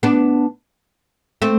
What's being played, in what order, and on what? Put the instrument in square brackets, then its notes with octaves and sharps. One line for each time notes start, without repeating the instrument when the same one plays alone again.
[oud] B3 D4
A3 C4